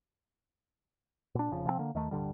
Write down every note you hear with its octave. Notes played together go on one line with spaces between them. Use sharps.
A#2 D4
F1 C#3 F3
C3 F3 F#3 C4
D3 A#3
D#2 D#3 A3
D1 G2 D3 G3